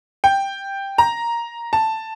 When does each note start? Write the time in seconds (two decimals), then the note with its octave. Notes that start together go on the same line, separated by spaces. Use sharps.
0.24 G5
0.98 A#5
1.73 A5